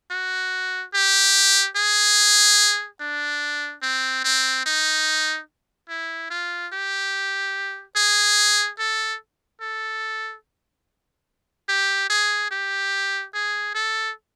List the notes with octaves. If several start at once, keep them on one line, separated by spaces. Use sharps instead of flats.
F#4
G4
G#4
D4
C4
C4
D#4
E4
F4
G4
G#4
A4
A4
G4
G#4
G4
G#4
A4